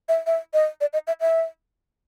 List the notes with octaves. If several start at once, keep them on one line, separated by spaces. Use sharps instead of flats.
E5
E5
D#5
D5
D#5
E5
E5